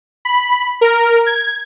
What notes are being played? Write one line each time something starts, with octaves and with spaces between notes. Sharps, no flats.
B5
A#4
G#6